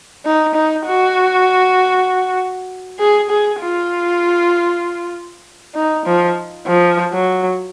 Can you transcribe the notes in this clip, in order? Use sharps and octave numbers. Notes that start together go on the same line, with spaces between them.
D#4
D#4
F#4
G#4
G#4
F4
D#4
F3
F3
F#3